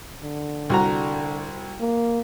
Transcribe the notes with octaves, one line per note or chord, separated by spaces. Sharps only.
D3
C2 F#4 A#5
A#3